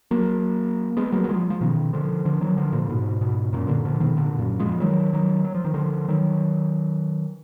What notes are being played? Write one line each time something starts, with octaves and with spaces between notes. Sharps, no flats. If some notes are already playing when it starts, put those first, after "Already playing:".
F#3 A#3
G#3 B3
F#3 A#3
F#3
F3 G#3
F3
B2 D#3
D3 F3
D3 F3
D#3 F#3
D3 F3
A#2 D3
G#2 B2
G#2 B2
F#2 A#2
A#2 D3
D3 F3
B2 D#3
A#2 D3
F#2 A#2
F3 G#3
D#3 F#3
D#3 F#3
F#3
F3
D#3
D3 F3
D#3 F#3